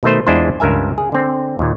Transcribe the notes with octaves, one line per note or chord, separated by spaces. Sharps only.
B2 D#3 A3 C5
E2 G#3 D4 E4 F4 C5
C#2 G2 A#4 E5 G#5
G#4
D3 C4
D#2 A#2